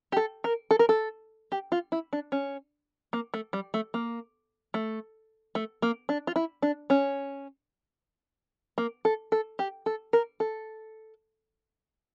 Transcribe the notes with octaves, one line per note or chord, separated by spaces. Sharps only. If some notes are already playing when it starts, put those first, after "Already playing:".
G4
A4
A#4
A4
A#4
A4
G4
F4
E4
D4
C#4
A#3
A3
G3
A3
A#3
A3
A3
A#3
D4
F4
E4
D4
C#4
A#3
A4
A4
G4
A4
A#4
A4